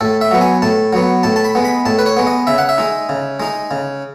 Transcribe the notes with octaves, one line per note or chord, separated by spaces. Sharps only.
A2 A4
E5
F#3 B3
G#5
A2 A5
F#3 B3
A2 A5
A5
B5
G#3 B3
B5
A2 A5
B4
C#5
G#3 B3
D#5
C#3 E5
F#5
E5
G#3 D#4
C#3
G#3 D#4
C#3